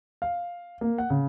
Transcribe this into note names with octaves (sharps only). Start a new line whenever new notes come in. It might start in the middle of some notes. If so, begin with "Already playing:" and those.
F5
A#3
F#5
C#3